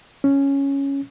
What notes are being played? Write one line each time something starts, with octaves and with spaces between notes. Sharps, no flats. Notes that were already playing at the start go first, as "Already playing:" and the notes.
C#4